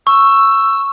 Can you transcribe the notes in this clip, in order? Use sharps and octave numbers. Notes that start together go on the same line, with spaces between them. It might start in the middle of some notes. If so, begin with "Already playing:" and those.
C#6 E6